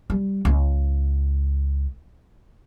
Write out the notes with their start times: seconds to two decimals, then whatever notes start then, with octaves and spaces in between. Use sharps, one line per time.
0.10 G3
0.45 C#2